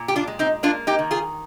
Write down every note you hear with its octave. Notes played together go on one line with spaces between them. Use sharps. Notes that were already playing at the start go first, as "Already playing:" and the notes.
Already playing: A#2
G4
D4 F4
G#3
C4 D#4
A#3 D4 F4
D#4 G4
D#3
F4 G#4